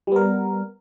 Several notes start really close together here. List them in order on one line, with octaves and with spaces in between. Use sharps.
G3 B3 A#4